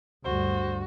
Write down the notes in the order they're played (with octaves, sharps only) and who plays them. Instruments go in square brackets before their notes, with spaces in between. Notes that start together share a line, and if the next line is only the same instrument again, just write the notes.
[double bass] D2 G2 [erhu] F#4 [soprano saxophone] C5